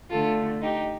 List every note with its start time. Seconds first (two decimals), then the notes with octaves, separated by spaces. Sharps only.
0.10 D3 A3 F4 A4
0.62 D#4 G4